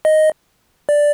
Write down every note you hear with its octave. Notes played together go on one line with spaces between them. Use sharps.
D#5
D5